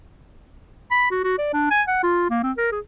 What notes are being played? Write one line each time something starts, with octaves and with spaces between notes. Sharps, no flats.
B5
F#4
F#4
D5
D4
G#5
F#5
F4
A#3
C4
A#4
G#4